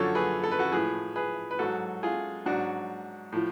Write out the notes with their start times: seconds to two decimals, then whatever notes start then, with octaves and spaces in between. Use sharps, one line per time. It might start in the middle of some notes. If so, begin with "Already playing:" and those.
Already playing: F#2 D3 F3 A4 C#5
0.15 G#4 B4
0.44 A4
0.51 B4
0.59 F#4 A4
0.72 A2 F3 G#4 B4
1.16 G#4 B4
1.51 B4
1.59 G#2 F#3 F#4 A4
2.03 F4 G#4
2.46 G#2 F#3 D4 F#4
3.32 A2 F3